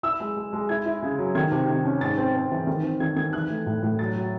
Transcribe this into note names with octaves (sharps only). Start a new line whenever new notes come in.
E4 E6
G#3
G#3
G#3
E4 G#6
E4
C#3
F#3
D#3 G#6
C3
D#3
C#4
G#2 A6
C4
C4
E3
D#3
C4
D#3 G#6
D#3 G#6
E3 F#6
A3
A2
A2
F#3 A6
F#3